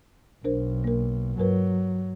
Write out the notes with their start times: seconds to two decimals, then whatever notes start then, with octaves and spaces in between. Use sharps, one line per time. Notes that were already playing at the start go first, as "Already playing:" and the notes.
0.44 B1 D4 A#4 C5
0.84 A#3 A#4
1.38 G2 F#3 A#4 B4